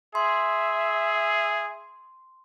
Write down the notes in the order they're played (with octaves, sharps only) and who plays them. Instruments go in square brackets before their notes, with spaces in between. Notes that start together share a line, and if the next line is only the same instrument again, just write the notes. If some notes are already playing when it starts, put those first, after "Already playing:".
[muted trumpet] G#4 [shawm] E5 [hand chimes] C6